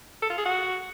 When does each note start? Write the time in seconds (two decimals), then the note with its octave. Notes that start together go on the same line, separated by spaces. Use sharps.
0.22 A4
0.30 F4
0.38 G#4
0.45 F#4